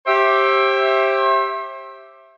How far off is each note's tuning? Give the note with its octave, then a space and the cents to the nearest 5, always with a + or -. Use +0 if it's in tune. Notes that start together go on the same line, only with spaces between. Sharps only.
G4 +0 C5 +40 E5 +0